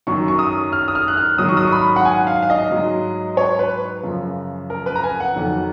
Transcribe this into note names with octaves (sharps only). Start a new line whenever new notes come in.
F#2 D#3 F#3 C#6
C#6
D#6
F6
D#6
F6
F#6
F6
G#2 D#3 F#3 D#6
C#6
D#6
C#6
B5
F#5
G#5
F5
F5
D#5
G#2 F#3
C#5
B4
F#2 C#3 F3
A#4
B4
A#5
G#5
F#5
F2 D#3 F#3